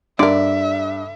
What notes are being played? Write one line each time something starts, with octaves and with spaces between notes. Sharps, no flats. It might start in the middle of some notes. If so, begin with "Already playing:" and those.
G2 D3 A#4 D5 E5